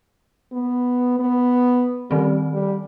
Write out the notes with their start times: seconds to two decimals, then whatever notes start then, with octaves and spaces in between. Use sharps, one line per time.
0.52 B3
1.19 B3
2.11 D#3 G3 C4
2.53 G3